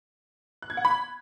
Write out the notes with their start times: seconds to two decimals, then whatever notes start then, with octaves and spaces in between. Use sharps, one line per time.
0.62 F#6
0.70 G#6
0.77 F#5
0.85 B5